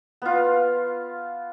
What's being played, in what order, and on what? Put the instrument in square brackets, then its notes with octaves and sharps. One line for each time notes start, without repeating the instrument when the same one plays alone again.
[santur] B3 F4